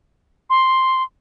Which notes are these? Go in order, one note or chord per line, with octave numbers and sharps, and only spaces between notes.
C6